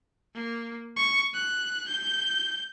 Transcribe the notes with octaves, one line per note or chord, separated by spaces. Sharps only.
A#3
C#6
F#6
G6